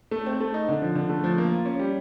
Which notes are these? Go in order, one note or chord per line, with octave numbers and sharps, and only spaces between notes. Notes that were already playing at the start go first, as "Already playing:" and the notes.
A3
C4
A3
D#4
D3
F3
D3
A3
F3
A#3
F4
C#4
G3